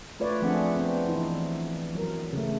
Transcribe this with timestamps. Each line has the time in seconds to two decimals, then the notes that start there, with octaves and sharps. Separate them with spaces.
0.20 A3 F4 B4 C#5 D5
0.42 F3 A3 C4 D4 G#4 F#5
0.75 B3 C4
1.07 E3 D#4 E4
1.95 F#3 A#4
2.33 C#3 A3